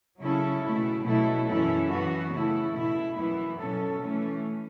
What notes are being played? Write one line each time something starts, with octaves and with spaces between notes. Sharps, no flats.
C#3 F#3 C#4 E4 A4
B2 A3 E4
B2 F#3 A3 E4 A4
F#2 E3 C#4 E4 A4
E3 B3 F#4
C#3 A3 E4 A4
B2 A3 E4
F#2 E3 B3 E4
B2 F#3 C#4 A4
E3 A3 C#4